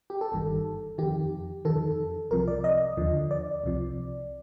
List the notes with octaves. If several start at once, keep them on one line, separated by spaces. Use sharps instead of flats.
G4
A4
G1 G2 D#3
F2 D#3 G4
F2 D#3 A4
C2 C3 F3 A#4
D5
D#5
D#2 D3 F3
D5
C2 C3 F3